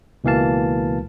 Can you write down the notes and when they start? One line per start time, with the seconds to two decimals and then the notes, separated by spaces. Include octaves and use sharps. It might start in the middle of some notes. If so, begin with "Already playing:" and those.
0.24 C#2 B2 E3 A#3 F5 A5